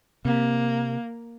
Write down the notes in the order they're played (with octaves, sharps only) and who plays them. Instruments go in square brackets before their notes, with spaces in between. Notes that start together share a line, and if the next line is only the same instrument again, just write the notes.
[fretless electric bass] C3 [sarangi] A#3